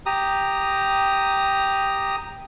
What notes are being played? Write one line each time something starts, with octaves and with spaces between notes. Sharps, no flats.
G4 A#5 D#6